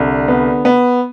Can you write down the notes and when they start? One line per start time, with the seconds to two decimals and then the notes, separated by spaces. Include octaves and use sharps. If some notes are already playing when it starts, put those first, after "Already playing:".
Already playing: C2 D3
0.28 B3
0.65 B3